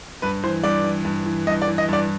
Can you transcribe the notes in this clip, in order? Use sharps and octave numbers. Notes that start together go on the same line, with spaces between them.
G2 B4
E3 C5
G2 D5
E3
G2
E3
G2 D#5
D5
E3
D#5
G2 D5